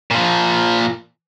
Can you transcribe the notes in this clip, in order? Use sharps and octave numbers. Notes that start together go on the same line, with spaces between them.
A#2 F3